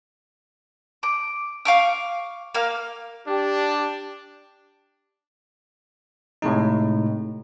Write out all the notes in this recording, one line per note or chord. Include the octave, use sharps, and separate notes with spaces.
D6
F5 C#6 D6
A#3 F5
D4 G4
A2 C3 G#3 D#4